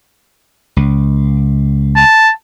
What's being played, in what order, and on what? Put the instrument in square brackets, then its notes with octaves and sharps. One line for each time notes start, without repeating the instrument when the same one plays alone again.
[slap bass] C#2
[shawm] A5